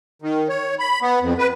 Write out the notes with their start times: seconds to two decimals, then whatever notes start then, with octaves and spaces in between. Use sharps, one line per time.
0.22 D#3
0.49 C#5
0.79 B5
1.02 B3
1.21 F2
1.38 B4